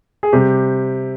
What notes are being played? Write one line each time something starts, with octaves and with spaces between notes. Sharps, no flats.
G#4
C3 G3 G4